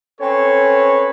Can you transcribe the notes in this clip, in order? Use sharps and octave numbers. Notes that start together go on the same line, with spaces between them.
C4 C#4 A4 B4 C#5